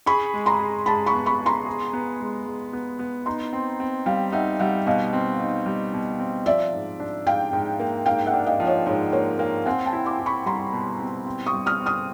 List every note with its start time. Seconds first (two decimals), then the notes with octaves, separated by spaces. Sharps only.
0.06 G#4 B5 C#6
0.34 G#3
0.46 A#5 C6
0.59 G#4
0.86 G#3 A5 B5
1.06 B5 C#6
1.14 B3
1.26 B5 C#6
1.40 G#4
1.46 A#5 C6
1.66 G#4
1.93 B3
2.20 G#3
2.46 G#3
2.73 B3
2.99 B3
3.26 D#4 A#5 C6
3.53 C4
3.80 C4
4.06 G3 F5 G5
4.33 D#4 E5 F#5
4.59 G3 E5 F#5
4.86 B2 D#5 F5
5.13 C4
5.40 D#4
5.66 G3
5.93 B2
6.20 C4
6.46 F3 D5 E5
6.73 G#2
7.00 D4
7.26 G#2 F5 G5
7.53 G#2
7.80 A#3
8.06 G#2 F5 G5
8.26 E5 F#5
8.33 D4
8.47 D#5 F5
8.60 F3
8.67 C#5 D#5
8.86 G#2 C#5
9.13 A#3 C#5
9.39 A#3 F5 G5
9.66 C4 F#5 G#5
9.86 G5 A5
9.93 E4
10.06 C6 D6
10.19 E4
10.26 B5 C#6
10.46 G3 A#5 C6
10.73 B2
11.00 C4
11.26 C4
11.46 C#6 D#6
11.53 G3
11.66 D#6 F6
11.80 C4
11.86 D#6 F6